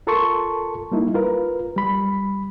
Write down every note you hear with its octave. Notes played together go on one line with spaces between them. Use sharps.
F4 A4 A#4 A5 C6 C#6
G3 A#3 D#4 E4
F4 A#4 B4
G3 B5